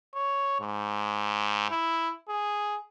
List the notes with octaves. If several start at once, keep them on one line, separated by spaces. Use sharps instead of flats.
C#5
G#2
E4
G#4